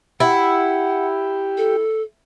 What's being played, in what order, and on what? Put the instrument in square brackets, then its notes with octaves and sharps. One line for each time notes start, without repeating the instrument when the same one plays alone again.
[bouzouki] E4 [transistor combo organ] G4 [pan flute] F#5
[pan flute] A4